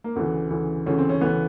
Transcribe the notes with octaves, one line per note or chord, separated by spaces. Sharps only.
A#3
D2 C#3 E3 B3
D2 C#3 E3
D2 C#3 E3 C#4
C4
C#3 C#4
D2 C#3 E3 B3